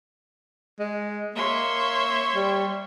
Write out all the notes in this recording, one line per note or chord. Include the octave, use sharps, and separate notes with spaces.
G#3
A#3 C#5 E5 C6
G3